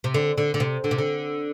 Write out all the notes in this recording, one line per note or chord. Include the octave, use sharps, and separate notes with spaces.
C3
D3
D3
D3
C3
D3
C3
D3